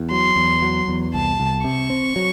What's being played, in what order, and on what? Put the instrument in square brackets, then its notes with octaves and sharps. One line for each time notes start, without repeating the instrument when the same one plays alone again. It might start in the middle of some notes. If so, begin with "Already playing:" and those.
Already playing: [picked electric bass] E2
[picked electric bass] F#3 [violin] C6
[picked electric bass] E2
F#3
E2
[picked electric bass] C2 [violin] A5
[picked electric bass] C2
[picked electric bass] C3 [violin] C#6
[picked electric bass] C4
F#3